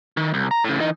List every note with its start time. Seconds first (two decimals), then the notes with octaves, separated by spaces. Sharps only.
0.17 D#3
0.34 C2
0.51 A#5
0.64 A2 C#3
0.80 E3 D#4